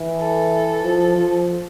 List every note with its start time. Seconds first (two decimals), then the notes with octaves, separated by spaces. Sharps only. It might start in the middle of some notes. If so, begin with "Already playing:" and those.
Already playing: E3
0.17 A4
0.83 F3
1.16 F3